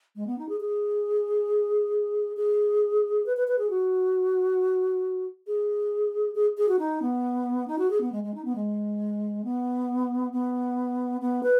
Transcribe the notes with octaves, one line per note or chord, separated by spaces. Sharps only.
G#3
B3
D#4
G#4
G#4
G#4
B4
B4
B4
G#4
F#4
G#4
G#4
G#4
F#4
D#4
B3
D#4
F#4
G#4
B3
G#3
G#3
D#4
B3
G#3
B3
B3
B3
B4